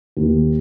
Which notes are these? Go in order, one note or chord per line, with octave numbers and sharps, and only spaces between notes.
D#2